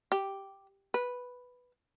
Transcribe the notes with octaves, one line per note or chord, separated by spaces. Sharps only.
G4
B4